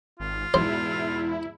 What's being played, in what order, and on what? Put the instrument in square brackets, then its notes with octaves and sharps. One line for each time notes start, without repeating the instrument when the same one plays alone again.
[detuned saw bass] G#1 [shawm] F4
[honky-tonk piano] E2 G#2 B2 [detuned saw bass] E4 [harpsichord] C5